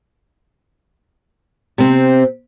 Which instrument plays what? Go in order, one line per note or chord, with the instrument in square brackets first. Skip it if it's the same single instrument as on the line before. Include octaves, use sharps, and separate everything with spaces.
[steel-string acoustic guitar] C3 C4